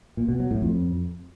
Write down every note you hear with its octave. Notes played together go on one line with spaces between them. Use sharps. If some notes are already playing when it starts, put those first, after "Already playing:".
A#2
B2
F#3
A2
F2